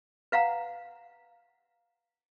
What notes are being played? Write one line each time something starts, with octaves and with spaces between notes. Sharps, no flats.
B4 F5 F#5 A#5